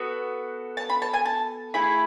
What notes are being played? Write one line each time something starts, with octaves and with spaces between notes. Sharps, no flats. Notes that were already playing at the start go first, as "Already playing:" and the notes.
Already playing: B3 F#4 A4
A5
B5
A5
G#5
A5
A3 E4 G#4 B5